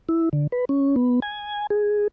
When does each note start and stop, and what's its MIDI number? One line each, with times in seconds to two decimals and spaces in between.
0.09 0.29 64
0.33 0.47 50
0.52 0.65 71
0.69 0.96 61
0.96 1.20 59
1.22 1.67 80
1.70 2.08 68